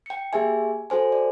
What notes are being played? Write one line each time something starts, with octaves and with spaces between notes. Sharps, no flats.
G5 C#7
A#3 G4 G#4 E5 G#5
F#4 A4 C5 G#5
D5